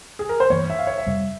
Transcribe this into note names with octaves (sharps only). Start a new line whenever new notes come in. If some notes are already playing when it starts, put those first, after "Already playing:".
G#4
A#4
C5
G2 E3 A#3 C#5
E5
F5
C#5
E5
F2 C3 G3